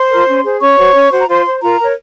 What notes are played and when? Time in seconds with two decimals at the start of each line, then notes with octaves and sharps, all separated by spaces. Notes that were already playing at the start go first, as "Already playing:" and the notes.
Already playing: C5 C6
0.10 F4 A#4
0.27 C#4
0.44 G#4 C5
0.61 C#4 C#5 C#6
0.78 F#4 C5
0.95 C#4
1.12 F#4 C5
1.19 A#5
1.29 F4 C5 C6
1.45 C5
1.62 F4 A#4 A#5
1.79 A#4 C#5